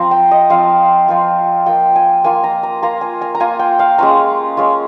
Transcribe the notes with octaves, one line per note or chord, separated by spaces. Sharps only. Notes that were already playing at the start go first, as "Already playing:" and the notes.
Already playing: F3 C4 F4 A#5 C6
G5
D#5
F3 C4 F4 F5
F3 C4 F4
A#3 F4 G5
G#5
A#3 F4 G#5
A#5
A#5
A#3 F4 A#5
G#5
G#5
A#5
A#3 F4 G#5
G5
F5
G#3 C#4 F4 A#5
G#3 C#4 F4